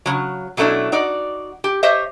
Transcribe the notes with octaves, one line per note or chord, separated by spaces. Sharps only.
C#3 F#3
B2 F#3 A3 C#4 D4 E4
D#4 F#4 D5
G4
G4 C5 C#5 D#5 E5